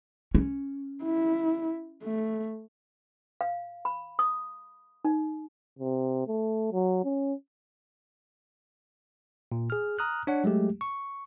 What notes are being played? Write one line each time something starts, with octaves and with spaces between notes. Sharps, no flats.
C#4
E4
A3
F5
B5
D#6
D#4
C3
A3
F#3
C#4
A#2
G#4 F6
A#5 D#6 F6 F#6
D4 C#5 F#5
F#3 G#3 A3 G4
C#6